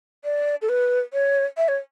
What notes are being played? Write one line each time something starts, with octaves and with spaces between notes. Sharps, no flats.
D5
A4
B4
C#5
E5
C#5